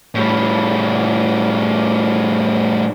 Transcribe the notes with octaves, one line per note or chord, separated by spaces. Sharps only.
A2 G3